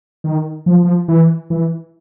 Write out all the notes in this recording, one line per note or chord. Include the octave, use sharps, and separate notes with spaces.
D#3
F3
F3
E3
E3